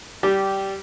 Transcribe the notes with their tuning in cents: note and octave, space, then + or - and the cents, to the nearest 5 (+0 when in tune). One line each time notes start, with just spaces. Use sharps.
G3 -10 G4 -15